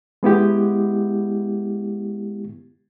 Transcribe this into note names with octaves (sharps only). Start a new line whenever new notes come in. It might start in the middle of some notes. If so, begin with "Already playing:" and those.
G#3 B3 E4 G4